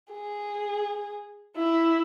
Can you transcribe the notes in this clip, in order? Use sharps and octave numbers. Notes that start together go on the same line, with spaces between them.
G#4
E4